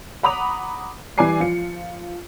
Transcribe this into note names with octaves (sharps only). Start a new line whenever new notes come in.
F#5 A#5 B5 D6 D#6 F7
E3 G3 D5 G#5 D6 C7
F3 F4 C#7